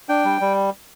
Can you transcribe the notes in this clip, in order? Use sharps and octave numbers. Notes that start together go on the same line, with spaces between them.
D4 G5
G3
G3